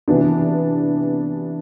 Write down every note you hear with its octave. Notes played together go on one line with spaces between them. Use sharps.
C3 E3 B3 D4